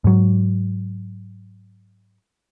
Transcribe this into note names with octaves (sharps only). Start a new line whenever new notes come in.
G#2 F#3